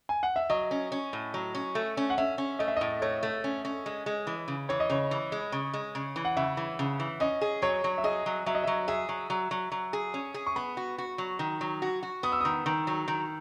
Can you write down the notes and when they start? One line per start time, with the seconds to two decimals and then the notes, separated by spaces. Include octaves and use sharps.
0.09 G#5
0.23 F#5
0.36 E5
0.50 F#3 D#5
0.71 C#4
0.92 C#4
1.13 A2
1.34 F#3
1.55 C#4
1.75 A3
1.97 C#4
2.10 F#5
2.18 C#4 E5
2.38 C#4
2.59 A3 D#5
2.68 E5
2.76 A2 D#5
3.02 A3 C#5
3.23 A3
3.44 C#4
3.65 C#4
3.86 G#3
4.06 G#3
4.27 E3
4.48 C#3
4.69 E3 C#5
4.80 D#5
4.90 C#3 C#5
5.11 E3
5.32 G#3
5.52 C#3
5.74 G#3
5.95 C#3
6.16 E3
6.25 F#5
6.37 C#3 E5
6.57 E3
6.79 C#3
7.00 E3
7.20 C#4 D#5
7.41 G#4
7.62 F#3 C#5
7.84 F#3
7.98 E5
8.04 G#4 D#5
8.26 F#3
8.46 F#3 E5
8.55 D#5
8.64 F#3 E5
8.88 G#4 E5
9.09 F#3
9.30 F#3
9.51 F#3
9.72 F#3
9.93 G#4
10.14 C#4
10.34 G#4
10.47 C#6
10.56 B3 B5
10.77 F#4
10.98 F#4
11.18 F#3
11.39 D#3
11.61 F#3
11.82 F#4
12.03 F#4
12.23 B3 D#6
12.32 E6
12.40 D#3 D#6
12.66 D#3
12.87 F#3
13.08 D#3